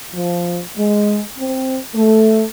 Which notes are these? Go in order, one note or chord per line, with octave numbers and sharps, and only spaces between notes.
F3
G#3
C4
A3